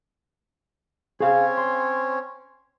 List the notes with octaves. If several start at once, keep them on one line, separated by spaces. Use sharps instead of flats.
C4 C#4 G#4 C#5 F5
C6